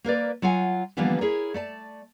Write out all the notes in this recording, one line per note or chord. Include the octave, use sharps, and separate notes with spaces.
A#3 A#4 B4 D5
F#3 F4 F#5 G#5
D3 E3 F3 G3 A#3 B3
E4 G#4 A#4 C#5
A3 D5 A5